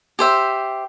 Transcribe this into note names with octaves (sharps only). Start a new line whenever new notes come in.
G4 C5 E5